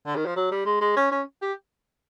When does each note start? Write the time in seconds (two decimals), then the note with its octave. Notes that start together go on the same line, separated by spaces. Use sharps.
0.06 D3
0.16 D#3
0.25 F3
0.36 F#3
0.51 G3
0.66 G#3
0.81 G#3
0.96 C#4
1.11 C#4
1.42 G4